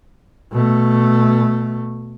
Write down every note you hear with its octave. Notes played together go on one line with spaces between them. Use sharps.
B2 A3